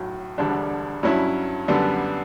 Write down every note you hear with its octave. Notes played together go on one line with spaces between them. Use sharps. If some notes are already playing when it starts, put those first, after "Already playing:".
Already playing: B1 A2 F#3
E1 D2 D3 G3 D4
G2 F#3 C#4 E4
F#2 D3 G3 B3 D4